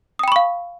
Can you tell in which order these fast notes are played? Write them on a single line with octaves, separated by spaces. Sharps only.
D#6 G5 B5 C#6 F5